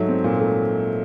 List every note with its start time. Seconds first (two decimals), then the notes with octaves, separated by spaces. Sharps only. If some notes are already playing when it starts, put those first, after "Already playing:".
Already playing: G#2 F#3 A3 E5
0.08 C4
0.24 A#2
0.39 A3